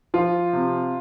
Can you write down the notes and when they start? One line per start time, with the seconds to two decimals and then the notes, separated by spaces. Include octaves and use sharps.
0.14 F3 F4
0.53 C3